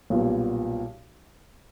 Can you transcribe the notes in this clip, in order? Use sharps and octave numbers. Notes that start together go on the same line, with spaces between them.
B1 A#2 G3 B3